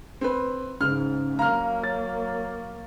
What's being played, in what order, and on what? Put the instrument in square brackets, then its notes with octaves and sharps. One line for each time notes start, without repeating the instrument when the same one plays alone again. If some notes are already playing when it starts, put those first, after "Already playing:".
[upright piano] C4 B4
[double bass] G#2 [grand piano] C#3 [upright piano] F6
[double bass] F#3 A#3 [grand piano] F5 [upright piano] A#5 F6
[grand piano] C#5 A6